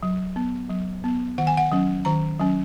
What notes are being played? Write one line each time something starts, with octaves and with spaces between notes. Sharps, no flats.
F#3
B3
F#3
B3
D#3 F#5
G#5
F#5
F#3 C#4
D#3 A#5
F#3 C#4